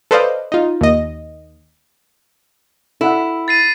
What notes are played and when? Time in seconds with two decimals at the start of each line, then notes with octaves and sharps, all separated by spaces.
0.11 A4 B4 C5 D5 D#5 F5
0.52 D#4 F4
0.81 D#2 D#5
3.01 E4 A4 E5 F#5
3.48 A6 C7 D#7